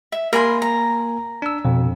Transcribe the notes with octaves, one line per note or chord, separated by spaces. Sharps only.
E5
A#3 A#4 G#5 B5 C6
A#5
D4 E6
F2 B2